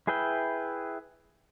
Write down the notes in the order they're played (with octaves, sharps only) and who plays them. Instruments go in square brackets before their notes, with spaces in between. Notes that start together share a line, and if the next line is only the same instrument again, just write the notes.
[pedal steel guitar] E4 G#4 B4 E5 G5